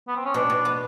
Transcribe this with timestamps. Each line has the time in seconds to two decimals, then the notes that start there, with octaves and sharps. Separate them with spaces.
0.07 B3
0.16 C4
0.25 C#4
0.34 B2 D4
0.50 B2
0.65 B3